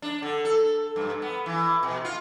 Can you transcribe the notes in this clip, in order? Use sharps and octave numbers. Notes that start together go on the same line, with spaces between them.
D4
D3
A4
G2
B3
E3
B2
F4